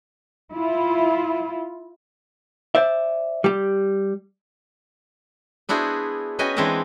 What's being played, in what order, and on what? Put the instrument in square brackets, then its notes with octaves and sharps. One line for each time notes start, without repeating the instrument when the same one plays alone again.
[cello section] E4 F4
[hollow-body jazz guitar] C5 D5 E5
G3 G4
[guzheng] B3 D4 E4 F#4 G#4 C5
C#4 F#4 B4 D#5 G5 G#5
E3 G#3 C4 D4 G#5 A#5